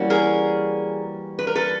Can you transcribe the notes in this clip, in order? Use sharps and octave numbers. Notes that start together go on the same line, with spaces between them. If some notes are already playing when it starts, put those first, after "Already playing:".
Already playing: E3 G3 A#3 C#4 F#4
G#4 A#4
B4
A#4
A4 B4